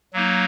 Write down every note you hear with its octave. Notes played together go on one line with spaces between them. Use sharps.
F#3 A#3 D#4